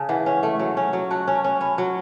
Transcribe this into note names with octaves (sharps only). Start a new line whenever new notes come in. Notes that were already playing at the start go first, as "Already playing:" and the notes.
Already playing: C#3 G#5 A5
E3 F#5
C#4
A3
F#3
C#4
F#3
F#4 A5
C#4
A5
C#4
C#4 B5
F#3